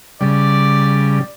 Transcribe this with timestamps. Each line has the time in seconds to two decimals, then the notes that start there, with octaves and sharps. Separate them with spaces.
0.21 C#3 G3 D5